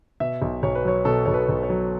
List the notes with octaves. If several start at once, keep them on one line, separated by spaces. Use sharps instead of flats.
B2 E5
B1
B1 C#5
B4
F#3 C#5
B2 A4
B1 C#5
B4
B1
C#5
F#3